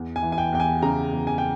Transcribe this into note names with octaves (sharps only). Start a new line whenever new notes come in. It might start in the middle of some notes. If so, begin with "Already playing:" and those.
Already playing: E2
G#5
E3
G#5
G5
E2 G5
G#5
C#3 A#5
E2
G#5
G5